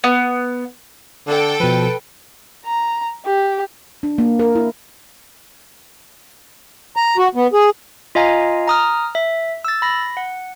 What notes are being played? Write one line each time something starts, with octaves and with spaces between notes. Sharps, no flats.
B3
D3 A4 G5
B2 F3 B4
A#5
G4
D4
A#3
A#4
E4
A#5
F#4
B3
G#4
F4 D#5 F5 G#5 A#5
A#5 D#6 F6
E5
E6 A6
B5 A#6
F#5